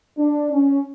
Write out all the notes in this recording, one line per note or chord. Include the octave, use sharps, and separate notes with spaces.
D4
C#4